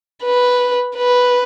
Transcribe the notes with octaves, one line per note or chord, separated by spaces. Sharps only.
B4
B4